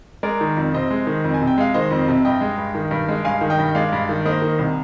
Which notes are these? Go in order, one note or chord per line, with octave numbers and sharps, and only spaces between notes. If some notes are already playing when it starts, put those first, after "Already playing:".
G#3 A#4 D5
D#3
F2
C3 C5 D#5
G#3
D#3
F2
G#5
C3
G5
G#3 F5
D#3 C5 D#5
F2
C3
G2 D#5 G5
G#3
G2
D#3
G2
G#3
G2 F5 G#5
D#3
D#5 G5
G2
G5
G#3 D5 F5
G2
D#3
A#3 C5 D#5
D#3
C2